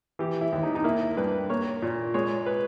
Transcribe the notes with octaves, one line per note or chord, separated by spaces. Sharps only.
E3 G4
E4
D#2
D#4
D#4
A#3 E4
G2 B4
A#3 C#5
A#2
G#3 C#5
B4